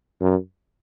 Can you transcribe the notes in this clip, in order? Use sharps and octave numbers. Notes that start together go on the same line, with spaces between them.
F#2